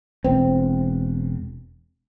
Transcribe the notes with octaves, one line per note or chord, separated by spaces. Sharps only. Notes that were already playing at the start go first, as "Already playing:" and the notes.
E1 C4